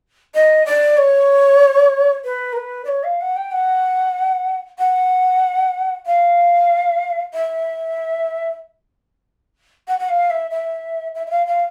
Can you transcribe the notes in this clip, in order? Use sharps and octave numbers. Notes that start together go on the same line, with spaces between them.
D#5
D5
C#5
B4
A#4
B4
D5
C#5
F5
F#5
G5
F#5
F#5
F5
E5
F#5
F#5
F5
E5
E5
E5
E5
F5
F5